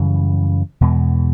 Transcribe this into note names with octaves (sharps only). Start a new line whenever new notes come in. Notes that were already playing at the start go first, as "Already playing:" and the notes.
Already playing: F#2 C#3 E3 G3
E2 B2 G#3